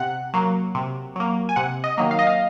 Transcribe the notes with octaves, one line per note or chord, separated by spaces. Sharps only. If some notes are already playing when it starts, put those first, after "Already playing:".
Already playing: C3 F#5
F#3 A#3
C3
F#3 A#3
G#5
C3 F#5
D#5
D#3 F#3 A#3
F5
D#5
F5